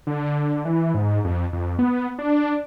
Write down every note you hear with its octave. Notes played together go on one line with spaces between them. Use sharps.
D3
E3
G#2
F2
F2
B3
D4